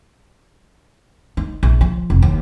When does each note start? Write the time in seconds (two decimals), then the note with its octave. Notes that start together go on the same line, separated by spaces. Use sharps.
1.37 D#4
1.63 A#1
1.81 F3
2.10 F1
2.22 D#2